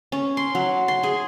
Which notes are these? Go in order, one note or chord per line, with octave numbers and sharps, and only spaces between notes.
C#4
C6
F#3
C6
G#4